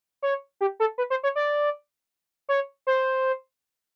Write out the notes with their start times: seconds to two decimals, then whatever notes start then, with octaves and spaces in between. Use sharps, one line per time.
0.22 C#5
0.61 G4
0.80 A4
0.98 B4
1.10 C5
1.23 C#5
1.36 D5
2.49 C#5
2.87 C5